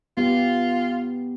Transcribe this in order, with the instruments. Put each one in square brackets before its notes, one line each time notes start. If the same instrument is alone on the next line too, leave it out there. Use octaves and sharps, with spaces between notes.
[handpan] B3 G4 [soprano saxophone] F4